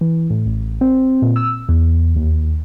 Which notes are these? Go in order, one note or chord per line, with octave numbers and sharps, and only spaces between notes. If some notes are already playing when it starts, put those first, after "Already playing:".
E3
A2
A1
C4
A#2
E6
E2
D#2